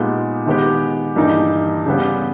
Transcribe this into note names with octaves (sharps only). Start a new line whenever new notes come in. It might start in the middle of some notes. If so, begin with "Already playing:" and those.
Already playing: A#2 G#3 B3 D#4 G4
D#3 G#3 B3 G4
G2 E3 A#3 D#4 G4
C#3 G3 B3 G4